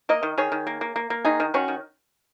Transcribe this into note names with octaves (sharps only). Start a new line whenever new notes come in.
A#3 A#4 D#5
D#3
D#3 G#4 C#5
D#3
A#3
A#3
A#3
A#3
D#3 D#4 G#4
D#3
D#3 C#4 F#4
D#3